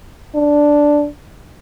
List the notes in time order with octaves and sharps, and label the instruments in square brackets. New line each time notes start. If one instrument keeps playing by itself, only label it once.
[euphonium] D4